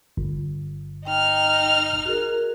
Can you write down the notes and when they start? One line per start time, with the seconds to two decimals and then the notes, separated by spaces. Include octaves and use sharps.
0.17 G1
1.05 D#4 G5 F6
2.05 F#4 G#4 A#4